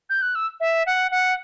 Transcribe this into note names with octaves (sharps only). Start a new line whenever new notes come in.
G6
F#6
E6
E5
F#5
F#5